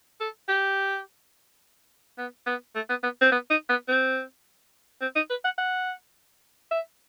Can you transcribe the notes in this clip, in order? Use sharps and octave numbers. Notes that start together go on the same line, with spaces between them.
A4
G4
B3
B3
A3
B3
B3
C4
B3
D#4
B3
C4
C4
D#4
B4
F#5
F#5
E5